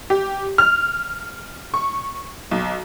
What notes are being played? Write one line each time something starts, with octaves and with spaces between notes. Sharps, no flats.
G4
F6
C#6
B1